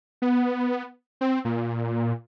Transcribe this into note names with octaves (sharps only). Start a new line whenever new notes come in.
B3
C4
A#2